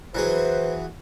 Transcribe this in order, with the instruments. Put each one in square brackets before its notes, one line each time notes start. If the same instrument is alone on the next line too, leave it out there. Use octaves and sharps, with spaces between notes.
[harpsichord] E3 F#3 G#4 [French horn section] B4 C5